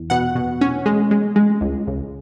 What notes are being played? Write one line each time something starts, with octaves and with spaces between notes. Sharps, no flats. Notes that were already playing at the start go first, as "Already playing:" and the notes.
Already playing: E2
B2 F#5
B2
C#4
G#3
G#3
G#3
C#2
C#2